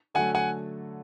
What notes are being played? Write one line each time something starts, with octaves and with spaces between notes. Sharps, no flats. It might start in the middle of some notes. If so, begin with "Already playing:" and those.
D3 F#3 A3 F#5 G#5
F#5 G#5